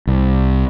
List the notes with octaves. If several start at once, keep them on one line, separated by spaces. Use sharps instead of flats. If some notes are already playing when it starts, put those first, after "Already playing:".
C2